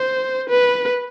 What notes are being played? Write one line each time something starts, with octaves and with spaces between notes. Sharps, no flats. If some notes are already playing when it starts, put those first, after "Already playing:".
Already playing: C5
B4